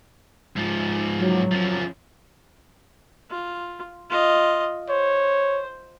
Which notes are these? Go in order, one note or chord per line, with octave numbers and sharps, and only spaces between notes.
G#2 F3
F#3
F#2 F3
F4
F4 D#5
C5 C#5